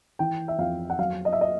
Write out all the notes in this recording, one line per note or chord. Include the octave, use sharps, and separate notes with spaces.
E3 G5
E5
F2 F5
F#5
F#3 F5
D#5
E5
D#5